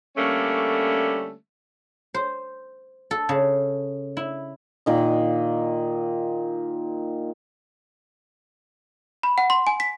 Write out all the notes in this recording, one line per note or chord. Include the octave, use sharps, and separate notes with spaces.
D3 G3 A3 A#3 C#4
C5
A4
C#3
E4
A#2 D#3 D#5
B5
F#5
C6
G#5
B6